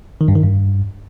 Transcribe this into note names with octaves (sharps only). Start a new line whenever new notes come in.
D#3
G2
D#3
G2